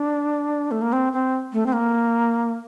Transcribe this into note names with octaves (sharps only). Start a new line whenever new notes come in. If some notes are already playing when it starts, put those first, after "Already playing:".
Already playing: D4
A3
A#3
C4
C4
A3
C4
A#3